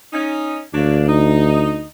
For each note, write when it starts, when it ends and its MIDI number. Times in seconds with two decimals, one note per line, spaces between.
0.13 0.62 61
0.13 0.62 63
0.74 1.84 38
0.74 1.04 54
0.74 1.04 58
0.74 1.04 62
1.08 1.84 63